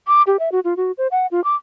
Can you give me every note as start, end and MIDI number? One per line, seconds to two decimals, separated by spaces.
0.07 0.22 86
0.27 0.37 67
0.39 0.52 76
0.52 0.60 66
0.64 0.77 65
0.77 0.92 66
0.98 1.08 72
1.11 1.27 78
1.31 1.43 65
1.44 1.56 86